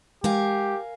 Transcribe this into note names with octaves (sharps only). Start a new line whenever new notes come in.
G#3 G4 A#4 F5 G#5